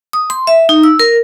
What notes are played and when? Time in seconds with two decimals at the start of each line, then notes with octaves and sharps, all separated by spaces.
0.13 D#6
0.30 C6
0.47 E5
0.69 D#4
0.83 E6
0.99 A#4